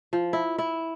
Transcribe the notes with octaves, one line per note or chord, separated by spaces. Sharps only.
F3
E4
E4